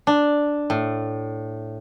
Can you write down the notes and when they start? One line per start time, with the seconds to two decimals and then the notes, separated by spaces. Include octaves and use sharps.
0.07 D4
0.70 A2